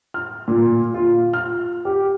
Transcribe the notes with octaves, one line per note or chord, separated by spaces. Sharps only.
F6
A#2
F4
F6
G4